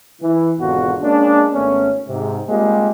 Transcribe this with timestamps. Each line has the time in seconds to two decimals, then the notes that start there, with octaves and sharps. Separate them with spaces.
0.22 E3
0.59 G#1 E2 B2 D3 F4 F#4
1.01 G#3 A#3 C#4 D4
1.54 G#1 A3 B3 C#4
2.08 G#2 C3
2.49 G3 G#3 A#3 C4 F4 G4